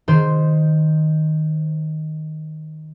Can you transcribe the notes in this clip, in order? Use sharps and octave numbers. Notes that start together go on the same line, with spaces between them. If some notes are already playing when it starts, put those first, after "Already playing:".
D#3 C5